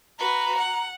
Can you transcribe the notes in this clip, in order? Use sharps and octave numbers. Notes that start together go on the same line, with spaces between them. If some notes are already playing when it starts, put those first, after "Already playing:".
F#4 B4 A#5
F#5